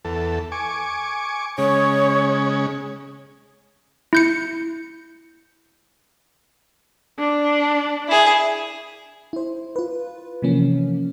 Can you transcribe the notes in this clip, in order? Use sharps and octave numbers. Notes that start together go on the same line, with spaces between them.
E2 A4
G#5 C#6 D6
C#3 G#3 C#4 C#5
E4 G6 C#7
D4
E4 G#4
E4 C5
F4 B4
C3 E3 F3 A#3 C#4